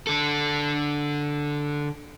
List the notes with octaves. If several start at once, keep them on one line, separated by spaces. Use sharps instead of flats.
D3 A4